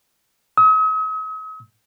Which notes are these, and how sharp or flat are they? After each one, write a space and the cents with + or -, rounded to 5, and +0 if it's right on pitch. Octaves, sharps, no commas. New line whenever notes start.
D#6 +45